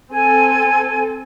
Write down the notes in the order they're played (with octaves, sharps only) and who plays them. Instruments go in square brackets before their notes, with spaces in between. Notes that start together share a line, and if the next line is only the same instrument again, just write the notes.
[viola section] C4 A4 [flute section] G#5